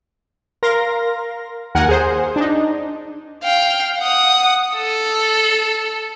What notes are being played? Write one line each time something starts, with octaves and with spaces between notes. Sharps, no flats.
A#4 F5 C6 A#6
D#2 A#4 F#5 G#5
G#4 C5
D4 D#4
F5 G5
F#5 D#6
A4